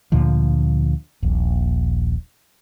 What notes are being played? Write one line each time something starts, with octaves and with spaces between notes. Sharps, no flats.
D2 A#2 D3 F3
D#1 A#1